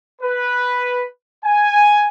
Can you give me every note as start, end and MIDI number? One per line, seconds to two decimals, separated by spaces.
0.22 1.03 71
1.44 2.09 80